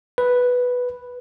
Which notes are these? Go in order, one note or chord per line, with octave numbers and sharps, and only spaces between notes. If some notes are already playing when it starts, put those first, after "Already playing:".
B4